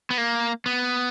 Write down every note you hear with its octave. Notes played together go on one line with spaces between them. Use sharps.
B3
A#3
B3